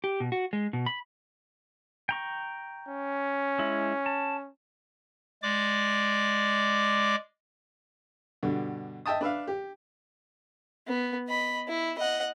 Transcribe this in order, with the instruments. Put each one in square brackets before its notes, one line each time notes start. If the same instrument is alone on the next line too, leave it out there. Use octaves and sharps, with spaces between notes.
[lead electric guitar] G4
B2
F#4
G#3
B2
B5
[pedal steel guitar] G5 A#5 C#6
[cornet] C#4
[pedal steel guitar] G#3 E4
A5
[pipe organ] G#3 D5 D6
[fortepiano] G2 B2 D3
D#5 E5 G5 A5 D#6
D4 B4 E5 F5
G4
[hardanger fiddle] B3
D#5 B5
E4
D#5 F#5